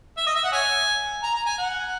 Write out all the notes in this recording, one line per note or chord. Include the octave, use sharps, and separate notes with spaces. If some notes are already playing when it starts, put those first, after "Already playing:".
E5
D#5
E5
F#5
C#5 E5 G#5
A#5
A#5
G#5
F#5